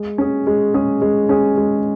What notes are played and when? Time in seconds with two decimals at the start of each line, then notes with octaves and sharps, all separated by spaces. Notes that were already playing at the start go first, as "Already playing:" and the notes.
Already playing: G#3
0.18 C#4 G#4
0.47 G#3
0.74 C#4 G#4
1.02 G#3
1.29 C#4 G#4
1.57 G#3